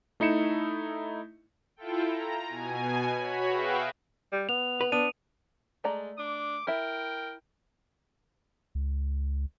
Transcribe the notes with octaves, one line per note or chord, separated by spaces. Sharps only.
A3 D#4 E4 C#7 E7
E4 F4 A4 G5
A#5
B2 G#5
F#4 C#5 B5
F#4 G#4 B4 E5 F5 G5
G3
B3 F7
B4
B3 D4 D#7
G#3 A3 D5 A#5
D4 D6
E4 A#4 E5 G5
C#2